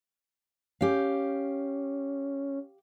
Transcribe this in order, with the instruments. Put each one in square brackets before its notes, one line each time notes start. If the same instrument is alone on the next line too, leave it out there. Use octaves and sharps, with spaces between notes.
[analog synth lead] C#4 [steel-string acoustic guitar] G4 F5